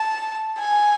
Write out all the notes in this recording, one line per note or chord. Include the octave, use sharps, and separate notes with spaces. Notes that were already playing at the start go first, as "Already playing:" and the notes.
Already playing: A5
G#5